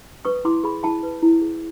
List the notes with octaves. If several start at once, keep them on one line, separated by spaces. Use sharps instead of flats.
B4 C#6 D#6
E4 C6 D6
G#4 B5 C#6
E4 A5 B5
B4
E4
G#4